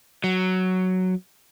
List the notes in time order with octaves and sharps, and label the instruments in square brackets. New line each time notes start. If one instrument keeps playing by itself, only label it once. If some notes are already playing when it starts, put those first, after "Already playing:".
[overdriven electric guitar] F#3